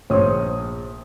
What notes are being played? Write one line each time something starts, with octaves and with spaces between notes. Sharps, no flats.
A#1 C5 C#5 D#6